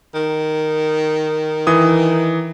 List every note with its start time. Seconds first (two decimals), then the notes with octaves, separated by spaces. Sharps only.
0.14 D#3
1.67 E3 D#6